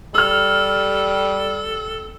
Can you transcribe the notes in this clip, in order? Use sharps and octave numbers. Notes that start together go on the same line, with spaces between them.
G3 A4 E6 F6